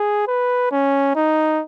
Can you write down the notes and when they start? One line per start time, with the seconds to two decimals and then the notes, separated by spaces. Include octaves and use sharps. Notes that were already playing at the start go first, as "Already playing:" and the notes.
Already playing: G#4
0.28 B4
0.71 C#4
1.15 D#4